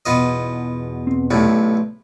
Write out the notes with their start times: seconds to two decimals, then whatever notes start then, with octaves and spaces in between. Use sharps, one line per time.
0.06 E2 B2 B3 F4 D#5
1.07 C4
1.31 B1 A2 C3 A3 B4 D5